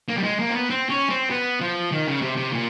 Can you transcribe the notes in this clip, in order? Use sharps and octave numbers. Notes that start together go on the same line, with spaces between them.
A#3
G3
G#3
A#3
C4
B3
C4
C#4
C4
B3
F3
D#3
C#3
C3
C3
A#2